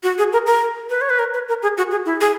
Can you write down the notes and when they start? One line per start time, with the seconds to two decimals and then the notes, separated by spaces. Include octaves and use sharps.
0.03 F#4
0.18 G#4
0.33 A#4
0.46 A#4
0.90 B4
1.01 C#5
1.10 B4
1.19 A#4
1.34 B4
1.48 A#4
1.63 G#4
1.78 F#4
1.91 G#4
2.06 E4
2.21 G#4